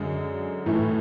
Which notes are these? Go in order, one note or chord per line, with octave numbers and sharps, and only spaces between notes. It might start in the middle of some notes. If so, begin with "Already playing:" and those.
Already playing: F#2 D3 G#3
A2 E3 A3